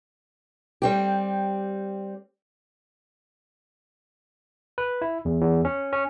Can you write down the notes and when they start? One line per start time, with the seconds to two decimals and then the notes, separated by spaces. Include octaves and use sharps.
0.82 G3 C4 G4
4.78 B4
5.02 E4
5.25 E2
5.41 E2
5.65 C#4
5.93 C#4